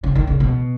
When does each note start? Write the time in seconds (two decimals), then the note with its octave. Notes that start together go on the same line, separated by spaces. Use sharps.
0.04 C#3
0.15 D#3
0.27 C#3
0.40 B2